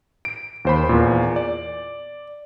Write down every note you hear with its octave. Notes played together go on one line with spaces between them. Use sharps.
D7
D#2 C5 B5
E2 A#2
D5